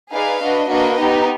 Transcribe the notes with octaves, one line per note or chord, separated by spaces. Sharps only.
D#4 G#4 B4 D5 F5
D4 F#4 B4 D#5
A#3 D4 F#4 B4 D#5
B3 D#4 G4